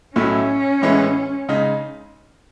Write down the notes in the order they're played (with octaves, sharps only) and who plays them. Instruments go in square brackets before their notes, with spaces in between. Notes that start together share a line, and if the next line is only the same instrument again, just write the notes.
[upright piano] B1 A2 F#3 A3 E4 [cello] C#4
[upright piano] A2 E3 G#3 B3
C#3 G#3 D#4